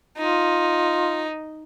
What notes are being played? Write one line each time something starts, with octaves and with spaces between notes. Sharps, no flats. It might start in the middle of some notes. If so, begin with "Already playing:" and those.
D#4 F4